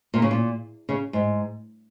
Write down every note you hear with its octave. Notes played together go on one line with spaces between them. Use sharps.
A#2
C#3
A#2
C#3
G#2